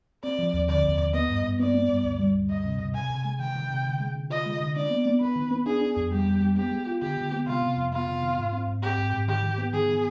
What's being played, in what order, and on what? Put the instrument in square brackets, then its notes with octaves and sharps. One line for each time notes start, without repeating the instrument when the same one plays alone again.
[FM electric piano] C4 [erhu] D5
[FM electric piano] F3
D#2
[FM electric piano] D3 [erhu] D5
[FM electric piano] D#2
D#2
[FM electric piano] B3 [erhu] D#5
[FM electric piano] G2
G2
[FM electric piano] B3 [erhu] D5
[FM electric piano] B3
G2
D2
G3
D2
[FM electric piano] D2 [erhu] D#5
[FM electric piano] C3
C3
[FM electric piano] C3 [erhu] G#5
[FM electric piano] C3
G#3
[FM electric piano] D#3 [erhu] G5
[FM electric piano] D#3
C3
D3
G#3
D3
[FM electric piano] F4 [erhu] D#5
[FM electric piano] G#3
D3
[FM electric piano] D4 [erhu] D5
[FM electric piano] B3
B3
[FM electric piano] B3 [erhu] B4
[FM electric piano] D#3
B3
[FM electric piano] D4 [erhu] G#4
[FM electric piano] D4
F2
[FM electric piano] G3 [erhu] G4
[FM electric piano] G3
G3
[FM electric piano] B3 [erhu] G4
[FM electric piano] G#3
F4
[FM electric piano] D3 [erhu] G4
[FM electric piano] D3
B3
[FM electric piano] C3 [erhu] F4
[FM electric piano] C3
F2
[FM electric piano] B3 [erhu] F4
[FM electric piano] C3
D#3
G#2
C4
G#2
[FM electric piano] C4 [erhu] G4
[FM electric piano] G#2
G#2
[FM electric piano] D#3 [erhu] G4
[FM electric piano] D#3
B3
[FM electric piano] D#3 [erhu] G#4
[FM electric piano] D#3